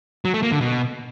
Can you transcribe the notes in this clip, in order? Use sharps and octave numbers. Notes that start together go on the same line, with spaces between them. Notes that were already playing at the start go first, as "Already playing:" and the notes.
F#3
A3
A#3
D3
B2